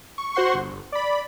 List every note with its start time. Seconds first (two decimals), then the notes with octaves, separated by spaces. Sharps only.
0.18 C#6
0.35 F#4 C5 F#5 C6 C#6
0.54 G1
0.92 D5 B5